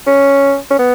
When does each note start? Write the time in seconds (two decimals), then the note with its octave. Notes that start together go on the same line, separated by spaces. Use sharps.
0.07 C#4
0.70 C#4
0.79 B3